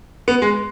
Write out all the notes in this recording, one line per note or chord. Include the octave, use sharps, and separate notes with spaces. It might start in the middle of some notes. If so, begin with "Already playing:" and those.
B3
G#3